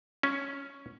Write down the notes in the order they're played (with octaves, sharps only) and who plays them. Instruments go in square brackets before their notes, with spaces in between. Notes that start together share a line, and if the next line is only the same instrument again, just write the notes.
[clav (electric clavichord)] C#4